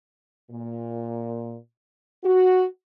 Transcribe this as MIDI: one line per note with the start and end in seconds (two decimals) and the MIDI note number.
0.51 1.55 46
2.24 2.66 66